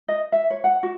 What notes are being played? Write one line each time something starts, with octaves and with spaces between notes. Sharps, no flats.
D#5
E5
C#5
F#5
F#4